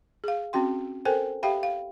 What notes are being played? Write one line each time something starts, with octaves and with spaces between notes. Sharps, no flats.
G#4 F5
C4 C#4 F#4 G5 C6
A4 A#4 C5 G5 G#5
G4 E5 F5 G5 B5
F5